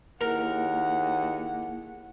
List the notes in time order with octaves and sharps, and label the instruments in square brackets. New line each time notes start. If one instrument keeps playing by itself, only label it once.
[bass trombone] D#2 [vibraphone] A#3 E4 G#4 [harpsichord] A#4 [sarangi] F#5